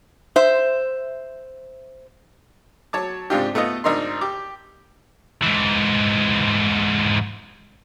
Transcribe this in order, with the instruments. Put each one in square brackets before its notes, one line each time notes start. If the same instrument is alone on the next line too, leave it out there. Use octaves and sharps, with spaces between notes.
[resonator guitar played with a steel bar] C5 E5
[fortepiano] F#3 C#5 A5 D6
G#2 C3 D4 F4 G4
A3 B3 F4 D#5
G#1 D4 D#4 A#4 C6
G4 D6
[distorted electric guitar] G#2 E3